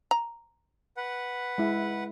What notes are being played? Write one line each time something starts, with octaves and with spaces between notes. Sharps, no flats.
A#5
B4 F#5
G#3 E4